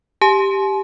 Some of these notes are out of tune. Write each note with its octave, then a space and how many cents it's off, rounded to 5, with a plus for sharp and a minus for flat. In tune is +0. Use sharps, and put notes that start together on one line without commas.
G4 +0 G#5 +45